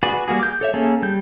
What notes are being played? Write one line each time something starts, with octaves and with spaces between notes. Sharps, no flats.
F#4 G#4 B4 D5
G3 A#3 F#4 G#4
D6 G6
A4 C#5 E5
A#3 C#4 G#4 A4
G3 G6